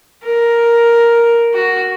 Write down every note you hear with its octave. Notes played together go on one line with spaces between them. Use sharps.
A#4
F#4